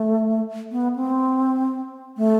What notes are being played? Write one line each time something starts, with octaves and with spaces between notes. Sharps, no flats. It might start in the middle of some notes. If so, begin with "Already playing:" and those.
Already playing: A3
B3
C4
A3